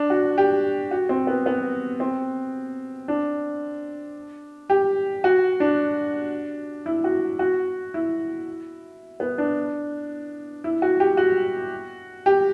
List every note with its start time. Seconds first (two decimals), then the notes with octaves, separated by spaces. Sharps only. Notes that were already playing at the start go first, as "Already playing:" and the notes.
Already playing: D4
0.10 F#4
0.38 G4
0.91 F#4
1.09 C4
1.27 B3
1.46 B3
2.00 C4
3.08 D4
4.70 G4
5.24 F#4
5.60 D4
6.86 E4
7.04 F#4
7.39 F#4
7.94 E4
9.20 B3
9.38 D4
10.64 E4
10.82 F#4
11.00 G4
11.17 F#4
12.26 G4